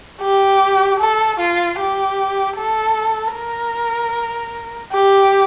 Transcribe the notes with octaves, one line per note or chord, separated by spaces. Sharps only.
G4
A4
F4
G4
A4
A#4
G4